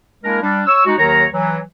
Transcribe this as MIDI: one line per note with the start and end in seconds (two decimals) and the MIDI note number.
0.24 0.38 56
0.24 0.38 58
0.24 0.38 62
0.24 0.38 64
0.24 0.38 70
0.42 0.63 55
0.42 0.63 62
0.67 0.83 73
0.67 0.83 85
0.67 0.83 88
0.86 0.94 56
0.86 0.94 63
0.86 0.94 66
0.98 1.26 39
0.98 1.26 51
0.98 1.26 54
0.98 1.26 70
0.98 1.26 73
0.98 1.26 82
1.32 1.59 52
1.32 1.59 54